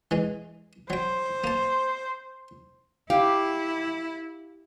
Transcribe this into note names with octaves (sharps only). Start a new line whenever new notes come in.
E3 G#3
F#3 C5 G5
A#3 A5
E4 G4 F5